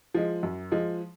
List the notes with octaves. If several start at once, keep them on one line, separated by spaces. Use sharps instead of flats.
F3 G#3
F#2
F3 G#3